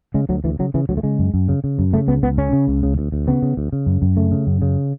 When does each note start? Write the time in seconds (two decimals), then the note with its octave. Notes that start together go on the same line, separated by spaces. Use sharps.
0.14 C#3 G#3
0.29 D2 F#3
0.44 D2 E3
0.59 C#3 F#3
0.74 C#3 E3
0.89 D2 F#3
0.97 A3
1.03 C#3 G#3
1.19 F#2
1.34 F#2
1.49 C#3
1.64 C#3
1.79 F#2
1.93 C#3 A3
2.08 C#2 B3
2.23 C#2 B3
2.38 C#3 C#4
2.53 C#3
2.68 C#2
2.83 C#3
2.98 D2
3.12 D2
3.27 C#3 B3
3.42 C#3
3.57 D2
3.73 C#3
3.86 F#2
4.02 F#2
4.16 C#3 A3
4.32 C#3
4.47 F#2
4.62 C#3